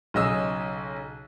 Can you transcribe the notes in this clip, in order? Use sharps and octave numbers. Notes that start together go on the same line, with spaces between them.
B1 C#3 G#4 D#5 G#5 E6